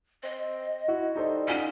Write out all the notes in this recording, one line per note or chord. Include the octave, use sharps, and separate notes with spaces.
C4 D#5
E4 F#4
G3 D#4 A4 C5
C#4 D#4 F4 F#5